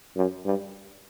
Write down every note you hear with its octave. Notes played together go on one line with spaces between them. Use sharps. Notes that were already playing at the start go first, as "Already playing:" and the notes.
F#2
G2